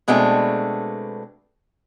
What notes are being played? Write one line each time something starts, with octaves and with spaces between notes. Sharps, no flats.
B2 G#3 A3 B3 C4 D4